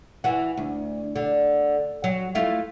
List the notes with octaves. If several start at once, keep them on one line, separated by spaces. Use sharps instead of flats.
E3 F#4
D2
D3
F#3
A3 E4 F4